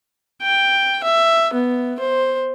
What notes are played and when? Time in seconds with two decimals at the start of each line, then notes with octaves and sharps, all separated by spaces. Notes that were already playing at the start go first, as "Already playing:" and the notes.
0.42 G5
1.04 E5
1.53 B3
1.99 C5